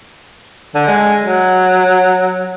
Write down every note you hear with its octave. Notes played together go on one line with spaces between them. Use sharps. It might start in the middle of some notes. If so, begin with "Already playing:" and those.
D3
G#3
F#3